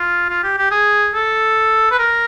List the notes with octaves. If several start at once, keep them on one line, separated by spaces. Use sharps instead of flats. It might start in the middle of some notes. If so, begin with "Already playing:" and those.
Already playing: F4
F4
G4
G4
G#4
A4
B4
A#4